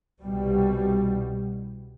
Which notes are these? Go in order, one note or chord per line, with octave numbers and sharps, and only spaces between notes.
C2 B2 G3